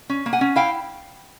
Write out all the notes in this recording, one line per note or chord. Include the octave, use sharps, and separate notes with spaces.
C#4
A#3
F#5 G#5
C#4
E4 F5 G5